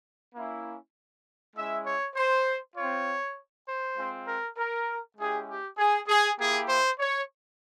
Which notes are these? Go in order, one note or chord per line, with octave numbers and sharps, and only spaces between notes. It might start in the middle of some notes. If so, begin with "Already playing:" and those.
A#3 C#4 E4
G#3 C#4 E4 E5
C#5
C5
C4 F4 C#5
C5
G#3 C4 F4
A#4
A#4
G#3 C#4 E4 G4 G#4
G4
G#4
G#4
A#3 E4 G4 G#4
C5
C#5